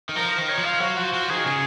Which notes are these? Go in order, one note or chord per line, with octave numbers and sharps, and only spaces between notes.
D#3
F3 A#4
A#4
D#3
C#5
F3
F5
F#3 F#4
F3 F#4
F3 F#4
D#3 G#4
C#3 G#4